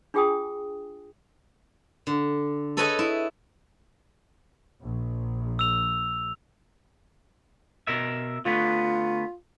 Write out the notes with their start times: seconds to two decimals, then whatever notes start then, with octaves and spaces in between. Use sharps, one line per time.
0.14 D4 F4 G#4 G5 G#5 D#6
2.07 D3
2.77 G#4 A4 B4 C#5 D#5 G#5
2.99 E4
4.82 A#1
5.59 E6 F7
7.87 B2 A#4 E5
8.45 D3 A3 B3 F4